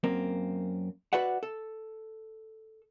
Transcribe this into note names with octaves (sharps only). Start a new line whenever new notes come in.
F#2 A#3 C4
F#4 B4 D5 E5 F#5
A4